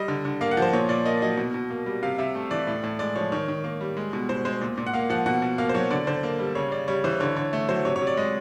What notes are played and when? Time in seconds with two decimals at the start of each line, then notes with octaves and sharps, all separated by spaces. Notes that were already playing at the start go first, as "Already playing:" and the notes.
Already playing: G3 D#5
0.08 D3
0.25 D3
0.41 A#3 F5
0.51 F#5
0.57 F3 C5
0.73 A#2 C#5
0.89 A#2 D5
1.05 A#3 D#5
1.22 F#3 D#5
1.37 B2
1.54 B2
1.70 A#3
1.86 G3
2.03 C3 F5
2.18 C3 E5
2.35 A3
2.51 E3 D5
2.67 A2
2.84 A2
2.99 G#3 D5
3.16 F3 C#5
3.32 D#3 C#5
3.48 D#3
3.64 A#3
3.81 G3
3.97 G#3
4.13 B2
4.29 B2 C5
4.45 G#3 C5
4.61 A#2
4.78 A#2
4.86 F#5
4.93 A#3 F5
5.10 F3 F#5
5.26 B2 F#5
5.42 B2
5.58 A#3 F5
5.69 C5
5.74 F#3 C#5
5.91 D3 D5
6.07 D3 C5
6.23 A#3
6.39 G3
6.55 C#3 C#5
6.72 C#3 D5
6.88 G3 C#5
7.04 E3 C5
7.20 D3 C#5
7.36 D3 C#5
7.53 A3
7.69 F#3 C5
7.85 C3 C#5
7.96 C#5
8.01 C3
8.07 D5
8.17 G#3 D#5